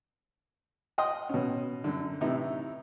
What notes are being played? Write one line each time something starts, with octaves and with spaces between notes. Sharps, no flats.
D#5 F#5 G5 C6 D#6
B2 C#4
F#2 D3
A2 C3 E3 D#4 E4